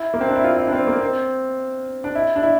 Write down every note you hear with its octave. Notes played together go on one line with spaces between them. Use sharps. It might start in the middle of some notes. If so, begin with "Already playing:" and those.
Already playing: E4
A#3
C4
D4
E4
F4
E4
D4
C4
A#3
C4
D4
E4
D4
E4